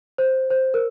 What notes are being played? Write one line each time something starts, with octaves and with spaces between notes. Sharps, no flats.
C5
C5
A#4